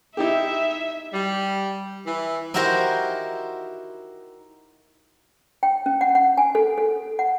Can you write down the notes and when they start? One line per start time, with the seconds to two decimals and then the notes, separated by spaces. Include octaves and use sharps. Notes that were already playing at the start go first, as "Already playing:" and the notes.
0.17 D#4 E4 G4 E5
1.13 G3
2.06 E3
2.54 D#4 E4 F#4 G4 A#4 C5
5.63 G5
5.86 C#4
6.01 F#5
6.15 F#5
6.38 G#5
6.55 A4
6.78 A4
7.19 F#5